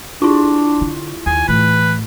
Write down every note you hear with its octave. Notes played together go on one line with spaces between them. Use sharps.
D4 E4 F4
D3
D#2 G#5
A2 E3 B4